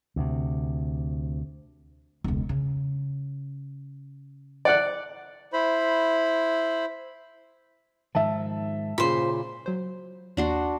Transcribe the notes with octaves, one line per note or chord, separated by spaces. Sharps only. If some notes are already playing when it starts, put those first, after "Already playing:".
D2 C3
E1 C#2
C#3
D5 F#5 F#6
E4 C5 B5
G#2 D#3 F3 E5 A5
A#2 C#3 C5 B5
F#3 C5
D#2 D4 F#4 C6